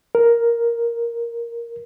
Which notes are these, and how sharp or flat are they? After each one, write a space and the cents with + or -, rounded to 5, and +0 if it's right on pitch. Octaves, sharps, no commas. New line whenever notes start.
A#4 +5